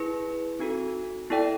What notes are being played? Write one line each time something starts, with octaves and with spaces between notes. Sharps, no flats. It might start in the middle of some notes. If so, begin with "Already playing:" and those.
Already playing: E4 G#4 B4
C4 D#4 F#4 A4
B3 E4 A4 D5 G5